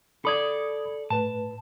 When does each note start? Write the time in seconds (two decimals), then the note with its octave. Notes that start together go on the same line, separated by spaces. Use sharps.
0.25 A4 D5 B5 D#6 G#6
1.10 A2 B4 A5